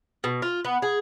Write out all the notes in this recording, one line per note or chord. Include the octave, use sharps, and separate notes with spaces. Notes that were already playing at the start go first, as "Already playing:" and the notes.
B2
F4
B3
G#4